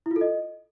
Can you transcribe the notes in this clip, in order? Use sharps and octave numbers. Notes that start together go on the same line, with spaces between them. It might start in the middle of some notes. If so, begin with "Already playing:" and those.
E4
F4
A4
D#5